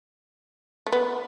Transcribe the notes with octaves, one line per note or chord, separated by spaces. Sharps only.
A3
B3